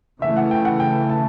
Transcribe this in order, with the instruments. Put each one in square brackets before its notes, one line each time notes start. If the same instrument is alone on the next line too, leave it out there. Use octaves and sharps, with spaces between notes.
[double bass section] C#3 E3 A3 [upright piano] E5
[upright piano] F#5
G5
F#5
G5
A5